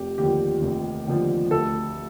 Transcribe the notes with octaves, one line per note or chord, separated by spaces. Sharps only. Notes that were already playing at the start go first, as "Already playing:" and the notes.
Already playing: F1 G4
D#2 D3 F3 G4
F1
D#2 D3 F3
D2 A4